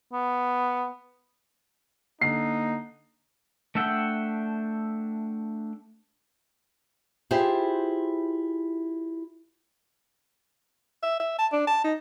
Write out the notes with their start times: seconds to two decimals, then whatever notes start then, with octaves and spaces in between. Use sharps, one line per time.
0.13 B3
2.21 D3 A#3 D#4 C7
3.75 A3 D4 E5 F#5 G5
7.31 E4 F4 G4 G#4 C5 E5
11.03 E5
11.20 E5
11.39 A5
11.53 D4
11.67 A5
11.84 D#4